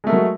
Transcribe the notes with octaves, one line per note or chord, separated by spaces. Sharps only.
F#3 G#3 A3 A#4